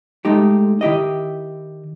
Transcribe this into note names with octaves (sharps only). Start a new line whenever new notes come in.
G#3 A3 D#4 G4
D#3 E4 G4 D#5